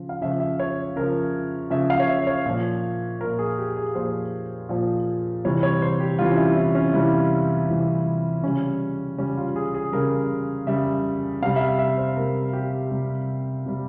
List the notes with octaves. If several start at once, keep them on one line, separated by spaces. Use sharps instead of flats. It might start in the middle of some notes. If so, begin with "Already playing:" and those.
Already playing: C#3 F3
F5
C#3 F3 E5
E5
C#5
C#3 F3 A#4
C#3 F3 E5
F5
C#5
E5
C#5
A#2 F3
A#2 F3 A#4
G#4
G4
G#4
A#2 F3 C5
A#2 F3
C3 E3 G3 C#5
C#5
C5
G4
C3 E3 G3 F4
C#4
E4
E4
C#4
C3 E3 G3 E4
C3 E3 G3
C#3 G3 C#4
C#3 G3 C#4
F4
G#4
G#4
C#3 G3 A#4
C#3 G3 E5
C3 G3 F5
E5
F5
E5
C5
C3 G3 A#4
G4
C3 G3
C3 G3